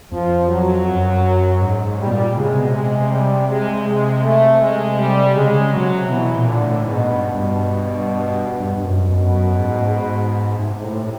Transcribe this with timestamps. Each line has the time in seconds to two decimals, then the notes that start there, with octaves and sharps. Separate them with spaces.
0.12 F2 F3
0.49 F#3
0.87 F#2
1.61 G#2
1.86 G#2
1.99 G3
2.07 B2
2.12 A#2
2.36 C#3 G#3
2.48 C3
2.59 B2
2.69 C3
2.74 G#3
3.11 G3
3.49 G#3
3.86 G#3
4.23 A3
4.61 G#3
4.98 G3
5.36 C#3 G#3
5.60 C#3
5.73 B2 F#3
5.85 C3
6.10 B2 E3
6.35 A#2
6.47 D3
6.61 A2
6.85 G#2 B2
7.10 G2
7.23 B2
7.35 G2
8.34 G2
8.60 G2
8.77 G2
8.84 F#2
9.09 F#2 B2
9.34 F#2
9.59 G#2
9.78 A2
9.84 G#2
10.59 G#2 C3
10.83 A2